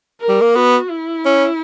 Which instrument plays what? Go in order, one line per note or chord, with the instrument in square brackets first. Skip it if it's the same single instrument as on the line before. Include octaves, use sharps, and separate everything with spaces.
[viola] A#4
[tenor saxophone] G3
A#3
[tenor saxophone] B3 [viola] F#4
[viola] E4
[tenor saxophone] C#4